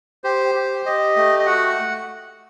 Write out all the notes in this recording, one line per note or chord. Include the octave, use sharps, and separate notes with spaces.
G4 C5
G4
G4 D#5
A3
D#5
F#4 F#5